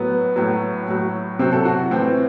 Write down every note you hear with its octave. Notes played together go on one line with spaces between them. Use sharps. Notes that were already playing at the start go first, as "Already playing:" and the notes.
Already playing: A2 F#3 B3
A2 F#3
A2 F#3
C3 F#3 C4
A4
F#4
A2 E3 C4